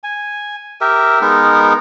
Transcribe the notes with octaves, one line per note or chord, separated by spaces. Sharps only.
G#5
G4 A#4 E5
G#3 B3 D#4 A#4